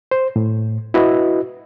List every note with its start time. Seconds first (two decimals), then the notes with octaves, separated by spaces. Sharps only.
0.11 C5
0.36 A2
0.94 E4 F#4 B4 D#5